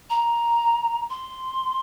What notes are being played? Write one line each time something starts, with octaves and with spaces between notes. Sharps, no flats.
A#5
C6